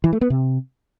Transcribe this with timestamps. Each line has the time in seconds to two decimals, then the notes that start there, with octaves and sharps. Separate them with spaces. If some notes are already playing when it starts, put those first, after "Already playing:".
0.04 E3
0.13 A3
0.21 B3
0.30 C3